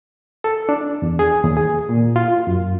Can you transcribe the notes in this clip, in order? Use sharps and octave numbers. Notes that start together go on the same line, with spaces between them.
A4
D4
E2
G#4
D#2
G#4
A#2
F4
F#2